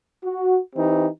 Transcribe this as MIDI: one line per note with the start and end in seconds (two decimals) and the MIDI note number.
0.24 0.59 66
0.75 1.07 52
0.75 1.07 60
0.75 1.07 63
0.75 1.07 67